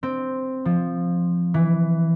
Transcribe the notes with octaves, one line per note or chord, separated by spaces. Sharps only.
C4
F3
E3